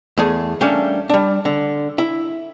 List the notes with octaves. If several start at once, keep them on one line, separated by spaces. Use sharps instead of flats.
E2 A3 G#4
G3 A3 A#3 C#4 D4
G3 D4
D3
E4